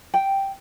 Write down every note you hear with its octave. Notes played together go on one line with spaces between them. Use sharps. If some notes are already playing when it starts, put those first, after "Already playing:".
G5